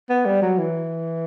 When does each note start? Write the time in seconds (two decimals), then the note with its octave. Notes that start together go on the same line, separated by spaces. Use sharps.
0.09 B3
0.25 G3
0.42 F#3
0.58 E3